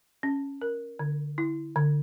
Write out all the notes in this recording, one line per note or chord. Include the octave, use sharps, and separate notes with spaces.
C#4
A#4
D3
E4
D3